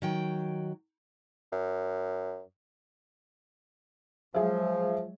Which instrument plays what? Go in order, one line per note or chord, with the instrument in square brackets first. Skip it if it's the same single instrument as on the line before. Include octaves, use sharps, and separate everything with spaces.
[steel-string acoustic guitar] D#3 F#3 G5
[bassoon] F#2
[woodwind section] F3 [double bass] F#3 G#3 [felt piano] G#4 E5